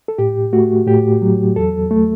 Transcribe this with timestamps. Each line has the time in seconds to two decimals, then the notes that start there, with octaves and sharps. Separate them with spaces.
0.08 A4
0.18 A2 G4
0.53 A3 F#4
0.87 A2 G4
1.22 F#3
1.56 E2 A4
1.91 A3